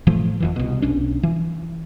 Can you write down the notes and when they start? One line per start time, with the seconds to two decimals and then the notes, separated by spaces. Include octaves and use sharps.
0.07 A2 E3 F3 A3
0.40 F#1 F2 E3
0.56 C2 B2
0.82 B1 C#4 D4
1.23 E3